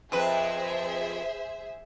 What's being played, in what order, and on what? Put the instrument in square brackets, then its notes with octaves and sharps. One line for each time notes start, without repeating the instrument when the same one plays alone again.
[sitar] F2 B4 [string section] G#4 C5 E5